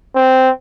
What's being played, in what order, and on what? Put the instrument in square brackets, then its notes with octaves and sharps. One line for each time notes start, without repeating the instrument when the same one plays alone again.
[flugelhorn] C4